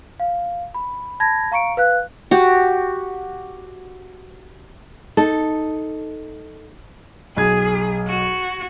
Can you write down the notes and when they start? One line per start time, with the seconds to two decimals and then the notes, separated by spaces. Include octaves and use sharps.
0.20 F5
0.74 B5
1.20 A5 B5 G#6 A#6
1.52 F5 A#5 C#6 C#7 D7
1.77 B4 F5 F#6
2.31 F#4 G4
5.17 D#4 A4
7.37 B1 G#4 G#6
8.08 F#4